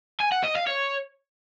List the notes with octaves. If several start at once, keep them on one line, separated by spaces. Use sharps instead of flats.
G#5
F#5
D#5
F5
C#5